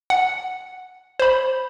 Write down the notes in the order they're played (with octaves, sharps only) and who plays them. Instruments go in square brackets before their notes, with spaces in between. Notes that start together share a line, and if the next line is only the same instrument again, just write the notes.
[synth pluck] F#5
C5 B5